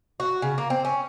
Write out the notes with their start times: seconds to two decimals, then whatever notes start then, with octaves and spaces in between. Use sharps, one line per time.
0.20 F#4
0.42 C#3
0.58 A#3
0.70 C4
0.85 C#4